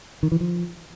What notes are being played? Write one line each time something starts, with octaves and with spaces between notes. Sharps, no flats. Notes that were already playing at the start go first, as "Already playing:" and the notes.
D#3
E3
F3